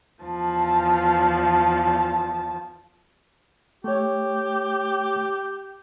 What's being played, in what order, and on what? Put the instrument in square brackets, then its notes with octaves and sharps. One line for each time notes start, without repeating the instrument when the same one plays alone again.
[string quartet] E2 F3 A5
[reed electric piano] A3 C#5 [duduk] G4